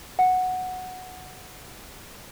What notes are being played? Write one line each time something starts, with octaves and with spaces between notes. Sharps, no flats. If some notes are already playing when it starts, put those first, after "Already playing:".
F#5